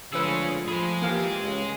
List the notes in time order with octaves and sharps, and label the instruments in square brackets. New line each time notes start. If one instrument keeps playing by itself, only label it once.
[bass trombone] D3 [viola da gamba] F3 G#3 A3 [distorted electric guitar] C#4 G#4 [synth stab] B4 E6
[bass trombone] F3 [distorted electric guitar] G#3 G#4 [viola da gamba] A3 [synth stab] B5
[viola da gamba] E3 G4 [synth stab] A#3 F5
[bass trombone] C#2 [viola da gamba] C#3 D#5